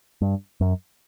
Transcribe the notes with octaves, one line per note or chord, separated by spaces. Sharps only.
G2
F#2